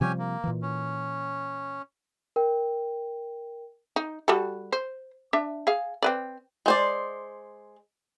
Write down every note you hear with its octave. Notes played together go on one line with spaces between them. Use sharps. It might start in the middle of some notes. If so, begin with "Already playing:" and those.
C3 F3 G3 C#4 G4 G#5
A#3
A#2 E3
C#4
A#4 G5
D#4
G3 F#4 A4
C5
D4 E5
G#4 F5
C4 B4 D5
G#3 C5 D5